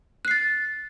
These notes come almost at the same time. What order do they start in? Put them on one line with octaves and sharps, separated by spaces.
F#6 C7 A6